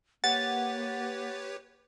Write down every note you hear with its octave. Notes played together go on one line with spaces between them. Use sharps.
A#3 G4 B4 C#5 F#5 A6